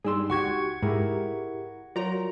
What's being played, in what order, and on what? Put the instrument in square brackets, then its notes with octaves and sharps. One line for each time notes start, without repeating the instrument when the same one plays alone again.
[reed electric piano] G2 G3 E6 [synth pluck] G#3 [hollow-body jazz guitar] D#4 D5 C6
[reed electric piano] C#2 F#4 G4 [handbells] F#5 C#6 G#6
[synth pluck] G#2 [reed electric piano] E4 G4 A#4 [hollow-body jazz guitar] G#4
[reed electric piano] F#3 [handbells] F4 [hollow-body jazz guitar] A#4 C#5 [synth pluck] D5 A#5